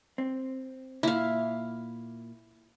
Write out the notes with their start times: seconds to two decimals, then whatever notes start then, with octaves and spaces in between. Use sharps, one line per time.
0.18 C4
1.03 A#2 E4 F5